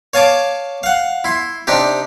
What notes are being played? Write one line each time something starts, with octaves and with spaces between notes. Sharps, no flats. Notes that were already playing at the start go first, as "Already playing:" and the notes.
C#5 F5 G#5 A5 D6
F5 F#5
E4 C6
C3 D4 D#4 G4